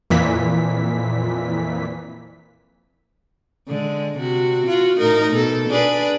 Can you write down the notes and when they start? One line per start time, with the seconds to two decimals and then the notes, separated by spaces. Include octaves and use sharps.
0.10 F2 A#2 E3 B6
3.68 D3 G#3
4.18 C3 F#4
4.67 F4 F#4
4.99 A2 D#4 A#4
5.32 B2 A4
5.70 D4 G#4 B4